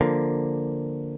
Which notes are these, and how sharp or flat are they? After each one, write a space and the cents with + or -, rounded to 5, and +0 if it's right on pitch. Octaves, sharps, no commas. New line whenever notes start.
D3 +0 F3 +0 A#3 +0